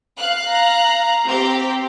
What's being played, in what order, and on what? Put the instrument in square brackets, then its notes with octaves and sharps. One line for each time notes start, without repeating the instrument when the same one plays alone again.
[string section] F5 F#6
[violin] A#5
[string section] C4 G4